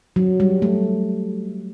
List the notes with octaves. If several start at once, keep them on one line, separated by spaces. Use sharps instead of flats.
F#3
G3
A3